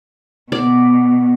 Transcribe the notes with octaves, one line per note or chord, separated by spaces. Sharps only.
B2 D5